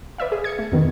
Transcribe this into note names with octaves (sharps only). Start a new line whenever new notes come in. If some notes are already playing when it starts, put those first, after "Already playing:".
B4 D5 E5 F5
G#4
G#6 C#7
A3
F2 B2 D#3